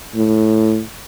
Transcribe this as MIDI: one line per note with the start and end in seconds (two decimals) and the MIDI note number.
0.15 0.80 45